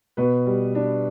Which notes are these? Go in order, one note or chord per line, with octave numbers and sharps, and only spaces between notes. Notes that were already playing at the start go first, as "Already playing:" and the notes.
B2 B4
G3
D4